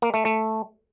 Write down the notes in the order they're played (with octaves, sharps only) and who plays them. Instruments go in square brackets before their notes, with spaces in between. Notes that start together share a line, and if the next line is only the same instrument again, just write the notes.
[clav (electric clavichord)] A#3
A3
A3